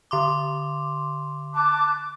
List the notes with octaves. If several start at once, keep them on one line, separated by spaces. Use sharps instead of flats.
D3 C6 D6
A5 D6 F#6